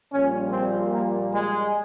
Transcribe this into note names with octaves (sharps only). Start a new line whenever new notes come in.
A#1 A#2 G3 C#4
C4
A#3
G#3